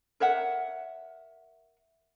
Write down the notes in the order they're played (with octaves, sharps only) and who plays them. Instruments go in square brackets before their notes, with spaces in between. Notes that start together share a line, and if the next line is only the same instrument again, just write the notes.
[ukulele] A#4 C#5 E5 F#5